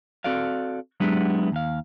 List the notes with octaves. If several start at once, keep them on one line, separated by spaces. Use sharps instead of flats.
C4 F#4 A4 D5 F5
F#3 G#3 B3 D4 E4 G4
D#2 F5